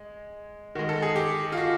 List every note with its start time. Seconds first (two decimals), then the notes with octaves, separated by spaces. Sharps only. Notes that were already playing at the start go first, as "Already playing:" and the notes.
Already playing: G#3
0.75 D#3 G#3 F#4
0.89 A4
1.02 G#4
1.16 G4
1.52 F4
1.57 F#4